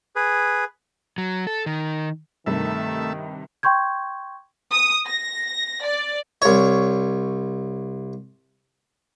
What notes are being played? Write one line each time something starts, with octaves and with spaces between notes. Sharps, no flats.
G#4 B4
F#3
A4
D#3
G2 C3 D#3 A3 E5
G5 C6 C#6 G6 G#6
D#6
A#6
D5
C2 C#5